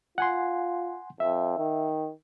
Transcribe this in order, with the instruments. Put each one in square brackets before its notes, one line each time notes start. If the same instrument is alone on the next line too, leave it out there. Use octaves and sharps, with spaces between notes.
[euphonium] F4 [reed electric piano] F#5 G#5 C6
[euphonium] F2 [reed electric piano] E5
[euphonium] D#3